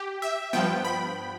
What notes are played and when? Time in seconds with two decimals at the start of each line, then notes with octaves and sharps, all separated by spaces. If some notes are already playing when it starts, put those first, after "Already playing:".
Already playing: G4
0.22 E5
0.53 G2 F3 B3 G5
0.85 B5